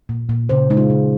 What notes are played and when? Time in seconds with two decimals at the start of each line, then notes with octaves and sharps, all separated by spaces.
0.09 A#2
0.29 A#2
0.49 C#3 C5
0.70 G#3 D#4
0.77 F4
0.90 C#3